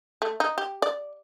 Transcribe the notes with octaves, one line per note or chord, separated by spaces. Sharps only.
A3
D#4
G4
D5